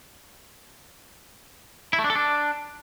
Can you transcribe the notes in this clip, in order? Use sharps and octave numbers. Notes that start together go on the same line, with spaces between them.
E4
A3
D4
A4
D4